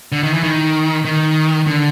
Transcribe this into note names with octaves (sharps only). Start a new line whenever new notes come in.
D3
D#3
E3
D#3
D#3
D3